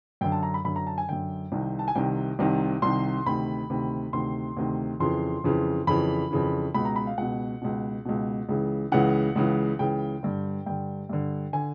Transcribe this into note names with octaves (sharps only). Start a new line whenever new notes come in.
F#2 D3 G5
A5
A#5
B5
F#2 D3 B5
A#5
A5
G#5
F#2 D3 G5
C2 C3 D#3
A5
G#5
C2 C3 D#3 G5
C2 C3 D#3
C2 C3 D#3 C6
D2 C3 D#3 B5
D2 C3 D#3
D2 C3 D#3 C6
D2 C3 D#3
F2 C#3 E3 C6
F2 C#3 E3
F2 C#3 E3 B5
F2 C#3 E3
C#2 B2 B5
A#5
B5
F5
C#2 B2 F#5
C#2 B2
C#2 B2
C#2 C#3 E3
C#2 C#3 E3 F#5
C#2 C#3 E3
C#2 C#3 E3 G5
G2 D3
G2 D3 G5
G2 D3
D3 G#5